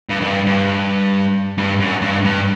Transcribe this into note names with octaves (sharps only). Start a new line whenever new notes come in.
G2
F#2
G2
G2
G2
F#2
G2
G2